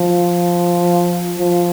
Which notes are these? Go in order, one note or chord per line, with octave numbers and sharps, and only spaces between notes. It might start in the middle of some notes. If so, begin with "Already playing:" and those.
Already playing: F3
F3